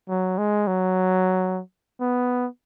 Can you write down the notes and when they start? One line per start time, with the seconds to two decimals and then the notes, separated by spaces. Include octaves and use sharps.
0.09 F#3
0.38 G#3
0.67 F#3
2.00 B3